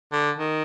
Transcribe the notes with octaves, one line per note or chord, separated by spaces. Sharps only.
D3
D#3